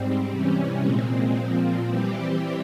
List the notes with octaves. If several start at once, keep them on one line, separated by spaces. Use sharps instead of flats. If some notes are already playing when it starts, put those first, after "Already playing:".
Already playing: G#2 G3 C4
C3 E3 G3 C#4
A#2 G#3 C4
A#2 F3 C4
E3 G3 C4 G4